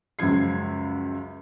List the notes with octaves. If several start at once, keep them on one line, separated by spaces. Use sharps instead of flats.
C#2 F#2 F3 G#6 C7